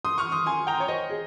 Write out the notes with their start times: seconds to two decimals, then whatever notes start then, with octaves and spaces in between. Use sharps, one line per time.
0.05 C6 D#6
0.18 C#6 F6
0.32 C6 D#6
0.46 G#5 C6
0.67 G5 A#5
0.80 C#5
0.88 C5 D#5
1.10 G#4